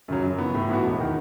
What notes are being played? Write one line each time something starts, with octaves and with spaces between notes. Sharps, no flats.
F#2 C#3 F#3
F#2
E3 B3
A2
E3 B3 F#4
E1
D#3